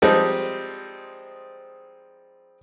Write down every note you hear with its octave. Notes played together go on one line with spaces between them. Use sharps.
F3 G3 G#3 C4 D#4